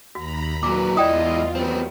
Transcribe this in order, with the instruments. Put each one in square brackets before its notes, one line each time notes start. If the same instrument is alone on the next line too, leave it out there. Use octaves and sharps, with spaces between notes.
[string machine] D#2 A#5 B5 [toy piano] F#4
[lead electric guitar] A#2 F#3 [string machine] B4 [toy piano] D6
[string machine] E2 F4 [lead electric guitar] G#2 E4 [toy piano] D5 G5 D#6 [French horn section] D#5
[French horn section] D#3 F#3 G3 [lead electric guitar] B3 C4